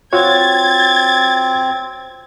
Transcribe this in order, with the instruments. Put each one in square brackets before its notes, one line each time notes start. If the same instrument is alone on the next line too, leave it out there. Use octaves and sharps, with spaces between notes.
[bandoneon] C4 [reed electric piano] F4 F#4 C#5 [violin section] G#6 A6